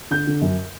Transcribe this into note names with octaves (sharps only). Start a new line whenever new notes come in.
D3 G6
D3
F#2